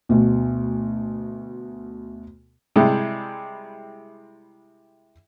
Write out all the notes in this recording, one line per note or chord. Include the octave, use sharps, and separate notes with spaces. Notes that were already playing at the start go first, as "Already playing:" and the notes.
D2 B2
C3 G3 G#3 E4 G#4